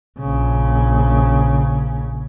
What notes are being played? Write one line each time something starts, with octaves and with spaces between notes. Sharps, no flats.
A#1 C#3